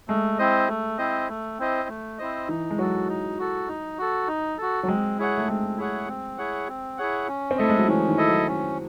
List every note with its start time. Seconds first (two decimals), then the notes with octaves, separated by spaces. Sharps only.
0.08 G#3 A3
0.38 C4 E4 C5 D#5
0.68 A3
0.98 C4 E4 C5 D#5
1.28 A3
1.59 C4 E4 C5 D#5
1.89 A3
2.19 C4 E4 C5 D#5
2.49 E3 D#4
2.71 G#3
2.78 F#3 F#4 A4
3.08 D#4
3.39 F#4 A4
3.68 D#4
3.98 F#4 A4
4.28 D#4
4.58 F#4 A4
4.83 F#3
4.88 G#3 C4
5.18 E4 G#4 C#5 F#5
5.38 A3
5.48 G#3 C4
5.78 E4 G#4 C#5 F#5
6.09 C4
6.38 E4 G#4 C#5 F#5
6.69 C4
6.98 E4 G#4 C#5 F#5
7.28 C#4
7.51 C4
7.57 A3 E4 A4 D#5
7.69 G#3
7.79 F#3
7.88 E3 C#4
8.07 D#3
8.18 E4 A4 D#5
8.28 F#3
8.48 C#4